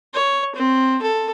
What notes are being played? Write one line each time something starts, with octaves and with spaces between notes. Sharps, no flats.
C#5
C4
A4